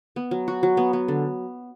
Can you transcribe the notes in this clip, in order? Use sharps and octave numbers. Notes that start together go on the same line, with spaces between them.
B3
F#3
F#4
F#3
B3
B3
D3